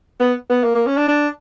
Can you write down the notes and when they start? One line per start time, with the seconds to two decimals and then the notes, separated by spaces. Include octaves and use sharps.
0.20 B3
0.49 B3
0.64 A#3
0.75 A#3
0.86 C#4
0.97 D4
1.08 D4